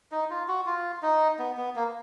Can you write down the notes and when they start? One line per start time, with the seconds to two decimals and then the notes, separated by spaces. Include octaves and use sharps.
0.12 D#4
0.30 F4
0.48 F#4
0.66 F4
1.02 D#4
1.39 B3
1.57 B3
1.76 A#3